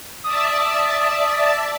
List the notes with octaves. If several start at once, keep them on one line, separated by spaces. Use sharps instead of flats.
D5 E5 A5 D#6